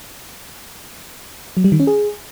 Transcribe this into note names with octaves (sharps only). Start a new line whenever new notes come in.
F#3
G3
D#3
C#4
G#4